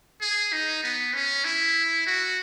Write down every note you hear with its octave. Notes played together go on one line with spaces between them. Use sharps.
G#4
D#4
B3
C#4
E4
F#4